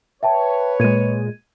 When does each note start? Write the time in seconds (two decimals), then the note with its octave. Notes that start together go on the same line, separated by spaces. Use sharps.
0.23 B4 C#5 E5 G5 A5
0.80 A#2 G#3 G#6 D#7